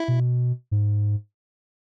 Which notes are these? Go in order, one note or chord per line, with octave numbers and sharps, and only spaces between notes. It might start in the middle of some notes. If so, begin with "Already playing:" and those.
Already playing: E4
B2
G#2